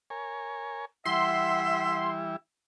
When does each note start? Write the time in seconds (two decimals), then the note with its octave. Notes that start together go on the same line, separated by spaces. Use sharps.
0.10 A#4 C#5 G#5
1.05 E3 G3 E4 E5 F#5 C6